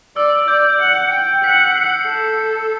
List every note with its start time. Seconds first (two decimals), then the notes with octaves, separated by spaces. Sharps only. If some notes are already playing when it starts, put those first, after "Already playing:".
0.16 D5 E6
0.48 D5 G6
0.80 F#5
1.12 G5
1.43 F#5 B6
1.75 C7
2.07 A4